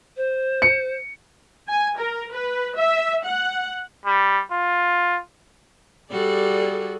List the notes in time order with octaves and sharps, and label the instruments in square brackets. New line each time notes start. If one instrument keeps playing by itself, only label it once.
[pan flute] C5
[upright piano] C#7
[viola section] G#5
A#4
B4
E5
F#5
[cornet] G3
F4
[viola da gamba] G3 F#4 D5 [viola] G#4 A4